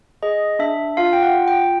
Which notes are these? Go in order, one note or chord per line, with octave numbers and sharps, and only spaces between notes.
G#4 D#5
D4 E5
F4 F5
G5
F#5
F4
G5